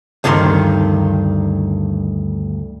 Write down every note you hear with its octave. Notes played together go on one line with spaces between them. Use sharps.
D2 G2 D#3 A#4 C6